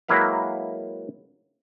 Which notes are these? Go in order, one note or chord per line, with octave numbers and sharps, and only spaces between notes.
F#3 G#3 A#3 E4 B4 F5